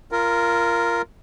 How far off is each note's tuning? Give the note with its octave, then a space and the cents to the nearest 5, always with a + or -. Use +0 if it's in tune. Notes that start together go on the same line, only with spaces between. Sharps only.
F4 -20 A#4 +0